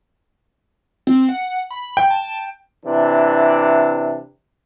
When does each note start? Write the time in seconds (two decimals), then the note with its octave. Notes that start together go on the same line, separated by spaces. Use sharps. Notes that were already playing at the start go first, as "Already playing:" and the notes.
1.07 C4
1.29 F#5
1.71 B5
1.97 G5
2.10 A5
2.86 C3 E3 D4